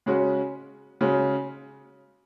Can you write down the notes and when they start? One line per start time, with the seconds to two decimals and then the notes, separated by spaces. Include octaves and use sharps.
0.06 C#3 G#3 C#4 F#4
1.01 C#3 G#3 C#4 F#4